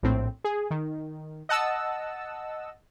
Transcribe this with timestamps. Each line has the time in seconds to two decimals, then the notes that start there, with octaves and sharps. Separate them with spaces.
0.03 A#1 A2 C4
0.44 G#4
0.71 D#3
1.49 D#5 F#5 A5 E6